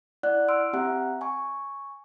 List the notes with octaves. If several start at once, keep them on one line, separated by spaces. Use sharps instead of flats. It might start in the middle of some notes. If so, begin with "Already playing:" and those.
E4 D5 F#5 F#6
C6 E6 F6 D7
C4 G4 E5 F#5 A#5 F#6
G#5 C#6